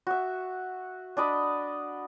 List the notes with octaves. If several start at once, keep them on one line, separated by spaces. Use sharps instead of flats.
F#4 E5
D4 D5 D#5 B5